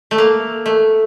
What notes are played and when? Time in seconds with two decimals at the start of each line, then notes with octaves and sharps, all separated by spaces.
0.11 A3
0.18 A#3
0.66 A3